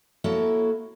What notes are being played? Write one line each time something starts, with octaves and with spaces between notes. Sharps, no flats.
A#3 E4 F#4 A4 C#5